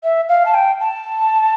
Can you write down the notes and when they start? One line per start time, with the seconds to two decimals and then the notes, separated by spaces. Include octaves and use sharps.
0.03 E5
0.29 F5
0.45 A5
0.54 G5
0.80 A5